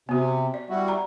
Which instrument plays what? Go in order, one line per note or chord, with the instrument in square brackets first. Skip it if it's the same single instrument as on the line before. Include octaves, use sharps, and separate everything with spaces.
[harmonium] C3 [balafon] B3 F#4
[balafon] D5
[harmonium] G3 E4 F#4
[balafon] A#5